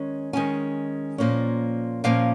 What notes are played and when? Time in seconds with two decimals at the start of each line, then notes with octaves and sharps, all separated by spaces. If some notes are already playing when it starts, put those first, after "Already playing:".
Already playing: D#3 G#3 C#4
0.33 D#3 G#3 C#4 G#5
1.18 A#2 F3 A#3 C#4
2.04 A#2 F3 A#3 C#4 F5